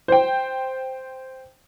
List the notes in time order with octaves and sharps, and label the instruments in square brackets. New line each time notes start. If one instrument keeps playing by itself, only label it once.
[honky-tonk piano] C5 G5